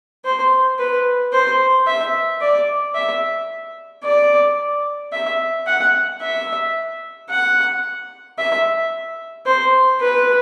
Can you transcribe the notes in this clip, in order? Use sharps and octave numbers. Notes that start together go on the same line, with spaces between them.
C5
B4
C5
E5
D5
E5
D5
E5
F#5
E5
F#5
E5
C5
B4